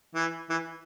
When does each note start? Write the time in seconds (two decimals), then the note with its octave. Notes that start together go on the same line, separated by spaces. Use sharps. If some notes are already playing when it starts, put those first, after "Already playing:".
0.15 E3
0.50 E3